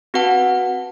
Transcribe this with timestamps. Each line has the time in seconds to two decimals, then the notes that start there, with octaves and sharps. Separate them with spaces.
0.14 C4 F#4 B4 F#5 A5